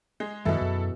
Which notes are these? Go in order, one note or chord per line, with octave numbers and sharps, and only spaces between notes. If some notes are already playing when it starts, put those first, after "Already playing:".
G#3 G#4
F#2 B2 D#3 E3 G3 E4 A4
F#2